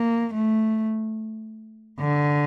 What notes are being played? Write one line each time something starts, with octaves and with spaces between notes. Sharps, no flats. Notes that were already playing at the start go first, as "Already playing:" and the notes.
Already playing: A#3
A3
D3